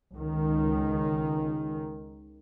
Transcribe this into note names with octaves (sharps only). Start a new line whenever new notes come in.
C#2 D#3